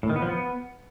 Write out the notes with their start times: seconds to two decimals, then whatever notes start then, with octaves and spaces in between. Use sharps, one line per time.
0.03 A2
0.10 D#3
0.16 B3
0.22 F3
0.28 B3